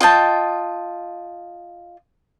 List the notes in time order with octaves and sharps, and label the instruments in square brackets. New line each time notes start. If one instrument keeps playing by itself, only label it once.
[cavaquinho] F4 D#5 G5 A5